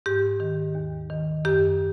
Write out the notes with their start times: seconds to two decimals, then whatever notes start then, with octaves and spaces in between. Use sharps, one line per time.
0.06 G#2 G4
0.40 D#3
0.75 D#2
1.10 D#3
1.45 F#2 G4